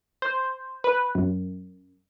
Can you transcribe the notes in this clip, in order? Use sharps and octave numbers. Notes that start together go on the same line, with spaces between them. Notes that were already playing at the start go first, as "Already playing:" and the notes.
C5
B4
F#2